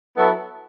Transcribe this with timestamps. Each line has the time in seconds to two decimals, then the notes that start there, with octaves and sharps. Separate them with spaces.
0.17 F#3 B3 E4 A4